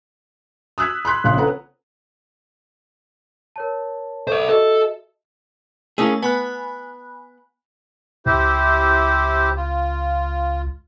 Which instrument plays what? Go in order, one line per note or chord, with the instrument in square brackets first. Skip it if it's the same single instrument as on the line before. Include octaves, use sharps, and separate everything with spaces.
[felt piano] D#6 E6 F#6 G#6 B6
B5 C6 F#6 B6
A#1 C#3 F5 C6 F#6
C4 C#4 A4 B4 F#5 A#5
[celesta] A#4 C#5 A5
[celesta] A4 C#6 D6 [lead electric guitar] C5 D5
[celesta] F#4 D#5 E5 [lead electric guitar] A4
[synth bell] A3 E4 A5 [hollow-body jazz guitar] A#3 C#4 G#4
[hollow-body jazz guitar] B3 [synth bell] G#5 B5 F#6
[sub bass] C#2 [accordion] E4 G4 C5
[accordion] F4